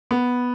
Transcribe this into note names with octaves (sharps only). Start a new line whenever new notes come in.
B3